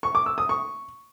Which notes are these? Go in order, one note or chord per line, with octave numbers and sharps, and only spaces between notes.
C#6
D6
E6
D#6
C#6